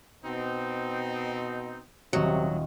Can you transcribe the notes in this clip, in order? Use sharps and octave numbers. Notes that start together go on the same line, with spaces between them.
B2 C4 D#4
D#1 C3 F#3 D#5 C#6